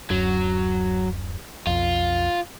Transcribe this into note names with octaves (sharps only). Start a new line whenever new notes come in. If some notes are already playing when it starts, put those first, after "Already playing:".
D1 F#2 F#3
B1 F2 F4